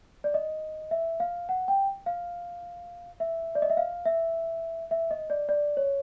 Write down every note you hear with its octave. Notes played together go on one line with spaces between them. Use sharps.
D5
D#5
E5
F5
F#5
G5
F5
E5
D5
D#5
E5
F5
E5
E5
D#5
D5
D5
C#5